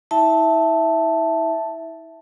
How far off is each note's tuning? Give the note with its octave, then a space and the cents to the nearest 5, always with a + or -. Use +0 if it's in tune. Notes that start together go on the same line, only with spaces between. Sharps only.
E4 -35 E5 +0 A5 +0